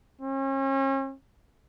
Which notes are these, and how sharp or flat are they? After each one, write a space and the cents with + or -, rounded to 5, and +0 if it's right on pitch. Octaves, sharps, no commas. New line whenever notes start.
C#4 -40